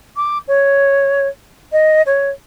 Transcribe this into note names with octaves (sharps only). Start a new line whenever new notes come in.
D6
C#5
D#5
C#5